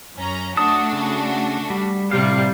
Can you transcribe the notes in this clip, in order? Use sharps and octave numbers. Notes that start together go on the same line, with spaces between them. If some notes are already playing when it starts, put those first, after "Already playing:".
F#2 C#4 A#5
A3 D4 F#4 A5 D#6
C#3
G3
A2 C3 G3 F5